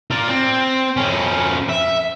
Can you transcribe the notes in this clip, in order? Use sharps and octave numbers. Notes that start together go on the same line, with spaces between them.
F4 D5
C4
F2 C#4
E5